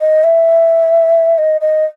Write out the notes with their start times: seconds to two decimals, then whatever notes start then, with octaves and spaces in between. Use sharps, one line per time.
0.01 D#5
0.24 E5
1.38 D#5
1.61 D#5